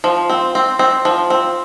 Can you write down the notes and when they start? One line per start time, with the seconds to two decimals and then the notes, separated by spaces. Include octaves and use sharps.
0.04 F3
0.29 C4
0.55 C4
0.79 C4
1.05 F3
1.30 C4